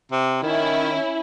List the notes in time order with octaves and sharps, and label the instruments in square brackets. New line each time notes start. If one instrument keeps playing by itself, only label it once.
[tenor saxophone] C3
[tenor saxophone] D#3 [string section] C#4 E4